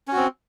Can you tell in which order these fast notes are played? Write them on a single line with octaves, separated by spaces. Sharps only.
C#4 F#4 C4